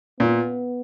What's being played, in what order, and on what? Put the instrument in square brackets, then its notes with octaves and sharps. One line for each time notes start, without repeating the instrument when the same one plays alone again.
[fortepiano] A#2 [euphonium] B3